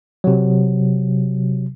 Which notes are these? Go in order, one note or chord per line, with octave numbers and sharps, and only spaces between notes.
C3 F#3